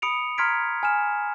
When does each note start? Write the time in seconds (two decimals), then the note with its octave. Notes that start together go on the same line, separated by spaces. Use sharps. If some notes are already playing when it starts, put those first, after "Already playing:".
0.02 B5 D#6 C#7 D7 F7
0.38 A#5 C6 F6 G#6 B6 D7
0.83 G#5 F6 E7